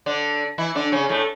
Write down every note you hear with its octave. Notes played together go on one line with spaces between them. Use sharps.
D3 D4
E3 E4
D3 D4
C#3 C#4
A2 A3